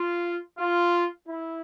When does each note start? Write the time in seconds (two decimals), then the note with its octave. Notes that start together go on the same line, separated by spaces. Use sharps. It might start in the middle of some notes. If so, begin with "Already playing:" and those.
Already playing: F4
0.58 F4
1.27 E4